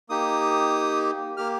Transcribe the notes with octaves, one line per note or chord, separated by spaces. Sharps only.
A#3 D#4 G4 D#6
A#3 G4 F6